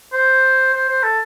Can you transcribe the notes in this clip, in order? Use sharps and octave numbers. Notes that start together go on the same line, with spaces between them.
C5
C5
C5
A4